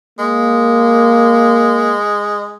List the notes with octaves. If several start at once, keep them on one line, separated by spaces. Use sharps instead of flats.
G#3 A#3